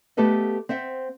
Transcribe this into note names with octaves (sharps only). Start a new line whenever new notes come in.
A3 B3 G4 A4 B4 D#5
C4 C5 E5 F#5